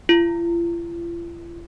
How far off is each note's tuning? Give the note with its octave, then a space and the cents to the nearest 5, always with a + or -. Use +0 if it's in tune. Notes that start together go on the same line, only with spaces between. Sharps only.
F4 -45